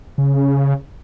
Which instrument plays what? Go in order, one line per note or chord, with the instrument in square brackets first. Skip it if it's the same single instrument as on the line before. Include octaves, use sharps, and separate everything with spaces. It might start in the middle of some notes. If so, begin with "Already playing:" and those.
[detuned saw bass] C#3